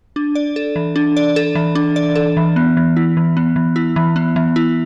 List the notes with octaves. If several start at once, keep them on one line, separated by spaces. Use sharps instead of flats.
D4
D5
A4
E3
D4
D5
A4
E3
D4
D5
A4
E3
B3
E3
E4
E3
B3
E3
E4
E3
B3
E3
E4